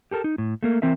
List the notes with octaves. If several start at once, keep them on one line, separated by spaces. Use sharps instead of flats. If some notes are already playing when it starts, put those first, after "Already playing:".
G4 A4 A#4 A5
D#4
A2
A3 A#3 A#4
E3 C4 A#4 E5